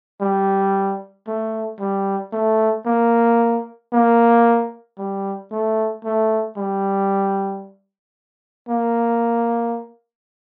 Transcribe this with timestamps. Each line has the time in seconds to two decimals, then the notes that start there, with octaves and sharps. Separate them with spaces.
0.21 G3
1.27 A3
1.80 G3
2.33 A3
2.86 A#3
3.93 A#3
4.98 G3
5.51 A3
6.04 A3
6.57 G3
8.69 A#3